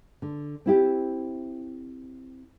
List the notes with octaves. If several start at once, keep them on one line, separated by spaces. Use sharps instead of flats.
D3
C4 E4 G4